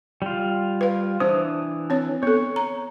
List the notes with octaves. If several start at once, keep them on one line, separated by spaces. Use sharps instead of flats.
G3 F4
B4 F5
E3 D4 C5 D#6
C4 C#5
B3 A4 C#5
A#5